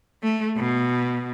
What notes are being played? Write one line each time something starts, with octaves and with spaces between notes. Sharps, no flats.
A3
B2